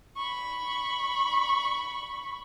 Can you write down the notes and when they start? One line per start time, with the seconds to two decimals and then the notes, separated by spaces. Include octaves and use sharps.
0.17 B5 C#6